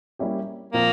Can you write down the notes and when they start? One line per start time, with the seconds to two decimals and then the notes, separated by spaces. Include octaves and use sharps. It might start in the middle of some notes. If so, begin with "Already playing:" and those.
0.19 G3 A#3 C#4 E4 G4
0.73 A#2 F3 A#3 C4